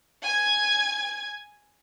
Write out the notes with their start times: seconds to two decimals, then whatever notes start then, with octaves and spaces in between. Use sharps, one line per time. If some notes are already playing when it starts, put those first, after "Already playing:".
0.22 G#5 G#6